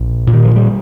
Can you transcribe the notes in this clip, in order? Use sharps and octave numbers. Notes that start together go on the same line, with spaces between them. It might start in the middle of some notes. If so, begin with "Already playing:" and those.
Already playing: A#1
A#2
D#3
F3
G3